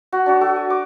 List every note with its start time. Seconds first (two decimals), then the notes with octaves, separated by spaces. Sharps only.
0.12 F#4
0.26 D4 F#4 C#5
0.41 F#4 A4
0.56 G#5
0.70 D6